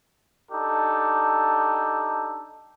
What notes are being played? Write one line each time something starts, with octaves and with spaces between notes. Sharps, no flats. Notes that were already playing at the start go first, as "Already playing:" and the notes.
D4 D#4 G4 A4